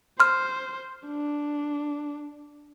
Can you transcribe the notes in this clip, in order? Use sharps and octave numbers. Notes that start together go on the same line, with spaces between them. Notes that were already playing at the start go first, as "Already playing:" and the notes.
C5 C6 F6
D4